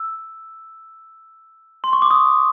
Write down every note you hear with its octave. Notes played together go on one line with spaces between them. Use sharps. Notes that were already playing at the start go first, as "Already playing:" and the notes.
Already playing: E6
C6
C#6
D6
D#6